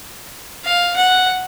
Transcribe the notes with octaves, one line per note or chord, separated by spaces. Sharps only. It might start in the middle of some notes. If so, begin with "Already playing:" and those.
F5
F#5